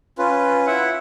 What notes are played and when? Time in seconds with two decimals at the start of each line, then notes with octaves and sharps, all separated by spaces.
0.18 C#4 F4 B4
0.67 E4 E5 F#5